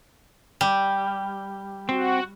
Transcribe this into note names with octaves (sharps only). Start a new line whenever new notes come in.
G3 G4
C4 F#4